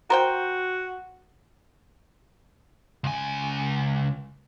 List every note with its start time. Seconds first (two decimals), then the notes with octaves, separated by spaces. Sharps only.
0.10 F#4 A#4 C5 G5
3.04 C#2 G#5